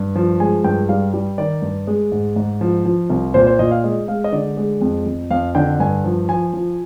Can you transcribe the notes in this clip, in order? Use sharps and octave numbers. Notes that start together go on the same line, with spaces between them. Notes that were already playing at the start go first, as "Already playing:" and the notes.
Already playing: G2
F3
G#3 G#5
G2 G5
G3 F5
G3
D#3 D5
G2
G#3
G#2
G#2
F3
F3
C2
A#2 C5
C5
A#2 D#5
F5
G#3 D#5
G#3 F5
D#5
D3 D5
G#3
F2
F2
F2 F5
D3 G5
G2 G#5
F3
F3 G#5
F3